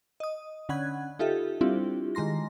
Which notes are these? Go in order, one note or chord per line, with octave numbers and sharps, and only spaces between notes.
D#5 D#6
D3 C#4 F#5 B5 F#6 G#6
D#4 F4 G4 A4 E5
G3 C4 D4 E4 F4 G4
D#3 G#3 A#5 C6 A#6